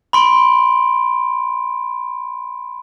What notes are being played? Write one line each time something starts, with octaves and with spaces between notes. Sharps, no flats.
B5 C6 D7